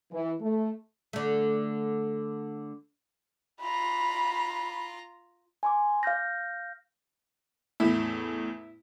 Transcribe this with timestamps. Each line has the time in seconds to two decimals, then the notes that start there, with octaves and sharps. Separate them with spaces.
0.12 E3
0.41 A3
1.13 D3 A3
3.62 F4 A#5 B5
5.63 G#5 C6 D6
6.03 F5 F6 G6 A#6
7.80 E2 A2 E4